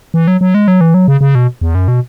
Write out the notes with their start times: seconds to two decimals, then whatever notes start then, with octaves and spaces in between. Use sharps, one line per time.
0.14 E3
0.28 F#3
0.41 F#3
0.54 G#3
0.68 F#3
0.81 E3
0.94 F#3
1.08 C#3
1.21 C#3
1.35 B2
1.61 E2
1.75 F#2
1.88 B2